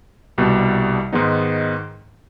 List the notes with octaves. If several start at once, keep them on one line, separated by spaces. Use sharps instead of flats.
C2 B2 G3
G#2 D#3 G#3 B3 D#4